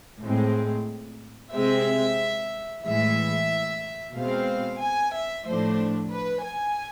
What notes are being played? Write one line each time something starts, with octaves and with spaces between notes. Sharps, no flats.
A2 G#3 C4
C3 G#3 C4 E5
A2 E3 G#3 E5
B2 G#3 C4 F5
G#5
E5
A2 F3 A3 D4 C5
B4
G#5